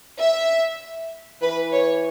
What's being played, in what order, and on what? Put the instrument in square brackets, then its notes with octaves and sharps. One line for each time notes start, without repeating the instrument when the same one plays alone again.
[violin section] E5
[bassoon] E3 [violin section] B4
[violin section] C#5